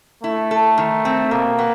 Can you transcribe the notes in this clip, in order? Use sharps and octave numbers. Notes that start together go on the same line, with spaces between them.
A3 E4
A4
D#3
C4
B2 A#3
B3